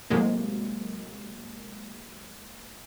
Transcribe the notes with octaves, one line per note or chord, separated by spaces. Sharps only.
A2 C3 F#3 G#3 A#3